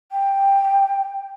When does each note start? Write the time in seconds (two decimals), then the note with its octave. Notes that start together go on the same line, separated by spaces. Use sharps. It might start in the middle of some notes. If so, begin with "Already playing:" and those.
0.12 G5